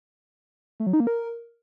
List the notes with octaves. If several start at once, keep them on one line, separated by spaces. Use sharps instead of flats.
A3
F#3
D#4
A#3
A#4